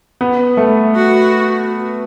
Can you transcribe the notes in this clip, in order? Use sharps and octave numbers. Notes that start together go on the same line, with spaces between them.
B3
A3
F#4